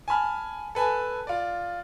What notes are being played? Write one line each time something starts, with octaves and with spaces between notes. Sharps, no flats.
G#5 A5 B5 F6
A4 B4 G#5 A5
F4 D5